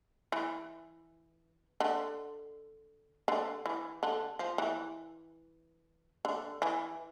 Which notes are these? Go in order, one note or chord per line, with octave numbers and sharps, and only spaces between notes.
E3
D3
D3
E3
D3
F3
E3
D3
E3